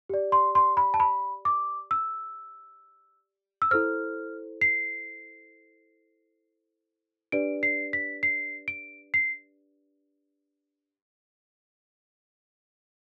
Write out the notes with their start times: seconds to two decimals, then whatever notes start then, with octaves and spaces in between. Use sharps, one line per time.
0.10 G4 D5
0.32 C6
0.55 C6
0.77 B5
0.94 A5
1.00 B5
1.45 D6
1.91 E6
3.62 E6
3.71 E4 A4 C5 F6
4.61 C7
7.32 D4 G4 B4 D5 D7
7.63 C7
7.93 B6
8.23 C7
8.68 D7
9.14 C7